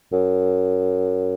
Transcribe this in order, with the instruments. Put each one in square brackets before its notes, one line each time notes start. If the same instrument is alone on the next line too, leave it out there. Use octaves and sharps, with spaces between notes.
[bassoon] F#2